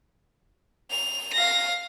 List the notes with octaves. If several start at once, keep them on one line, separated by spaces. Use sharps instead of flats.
F7
F5 A#6